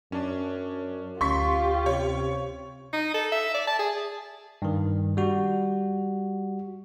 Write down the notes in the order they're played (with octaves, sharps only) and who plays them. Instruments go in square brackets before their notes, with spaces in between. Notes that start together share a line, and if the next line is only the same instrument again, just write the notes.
[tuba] F#2 [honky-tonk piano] C#4 D4
[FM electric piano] D2 C#4 [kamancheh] F4 G4 [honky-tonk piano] C6 C#6 B6
[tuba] C3 [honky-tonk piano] C#5
[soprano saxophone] D#4
A4
E5
D5
A5
G#4
[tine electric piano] G2 D#3
G3 F#4